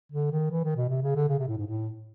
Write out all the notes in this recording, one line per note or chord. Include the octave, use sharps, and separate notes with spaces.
D3
D#3
E3
D#3
B2
C3
C#3
D3
C#3
C3
A2
G#2
A2